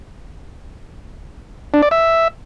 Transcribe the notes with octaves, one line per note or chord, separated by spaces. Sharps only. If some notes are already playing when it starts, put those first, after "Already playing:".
D4
D5
E5